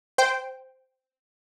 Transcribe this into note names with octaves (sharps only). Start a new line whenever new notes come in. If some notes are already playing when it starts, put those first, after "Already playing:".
C5 G5